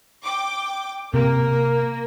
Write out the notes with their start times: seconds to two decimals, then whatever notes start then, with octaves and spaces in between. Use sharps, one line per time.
0.22 G5 D6
1.14 C3 A#3 A#4